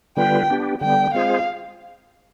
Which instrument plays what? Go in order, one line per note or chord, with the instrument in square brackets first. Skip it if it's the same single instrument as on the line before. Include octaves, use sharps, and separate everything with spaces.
[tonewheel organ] D3 G3 B3 F4 B4 [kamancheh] G5
[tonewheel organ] B3 D4 G4
[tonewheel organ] D3 G3 B3 [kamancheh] G5
[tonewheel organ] G#3 C4 F4 G#4 C5 [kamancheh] F5